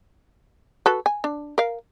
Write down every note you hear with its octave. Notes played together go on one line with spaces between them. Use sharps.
F#4 A4 B4
G#5
D4
A#4 F5